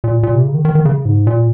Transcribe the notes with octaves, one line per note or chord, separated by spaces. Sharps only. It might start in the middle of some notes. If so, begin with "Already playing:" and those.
A#2
A#2
C3
C#3
D#3
D#3
D#3
C#3
G#2
A#2